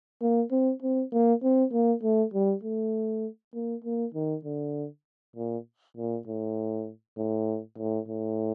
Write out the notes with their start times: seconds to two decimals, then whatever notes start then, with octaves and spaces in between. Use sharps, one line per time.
0.22 A#3
0.51 C4
0.82 C4
1.12 A#3
1.43 C4
1.72 A#3
2.03 A3
2.34 G3
2.64 A3
3.54 A#3
3.84 A#3
4.14 D#3
4.45 D3
5.36 A#2
5.97 A#2
6.27 A2
7.18 A2
7.78 A2
8.08 A2